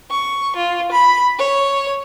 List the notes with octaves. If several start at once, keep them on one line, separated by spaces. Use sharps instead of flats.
C#6
F4
B5
C#5